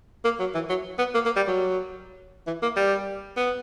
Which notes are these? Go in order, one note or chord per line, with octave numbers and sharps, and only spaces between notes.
A#3
F#3
E3
F#3
B3
A#3
A#3
G3
F#3
E3
A#3
G3
B3